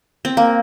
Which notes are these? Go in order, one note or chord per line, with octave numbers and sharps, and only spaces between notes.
C4
A#3